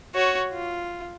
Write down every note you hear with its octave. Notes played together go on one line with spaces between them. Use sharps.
F#4 C#5
F4